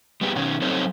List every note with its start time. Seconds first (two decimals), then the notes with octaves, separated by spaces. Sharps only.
0.21 G3 B3 G4 G#4
0.36 B2 D#3 C#4
0.62 F#3 C4 D#4 A4 C5 C#5